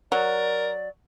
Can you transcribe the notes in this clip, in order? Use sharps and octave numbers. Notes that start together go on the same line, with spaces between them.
F#3 A#4 D5